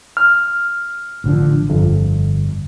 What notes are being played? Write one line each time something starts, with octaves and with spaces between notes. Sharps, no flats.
F6
A1 D3 F3
G1 F2